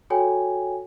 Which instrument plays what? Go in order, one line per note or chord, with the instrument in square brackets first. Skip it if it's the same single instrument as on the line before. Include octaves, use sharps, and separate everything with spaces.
[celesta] F#4 A4 C#5 G5 G#5